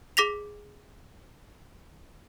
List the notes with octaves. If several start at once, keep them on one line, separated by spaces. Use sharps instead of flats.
G#4 D6 A#6 B6 F7